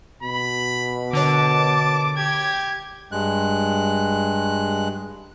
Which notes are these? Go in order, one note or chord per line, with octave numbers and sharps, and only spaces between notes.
B2 B5
D3 A#4 C#5 A5 D6
G4 G#6
G2 G#3 F#6